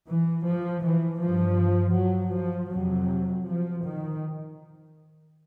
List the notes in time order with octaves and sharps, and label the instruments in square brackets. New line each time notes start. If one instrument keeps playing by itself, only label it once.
[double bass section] E3
F3
E3
G2 F3
F#3
F3
F2 C3 F#3
F3
D#3